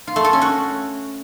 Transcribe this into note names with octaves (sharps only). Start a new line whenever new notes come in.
F4
A3
A4
C#4
F#4